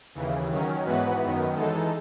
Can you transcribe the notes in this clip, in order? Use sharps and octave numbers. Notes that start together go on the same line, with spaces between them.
D#2 C#3 E3
D#3 F#3 C#4
G#2 E3 B3 F#4 B4
F#2 D#3 F#3 B3
E3 G#3 D#4 A4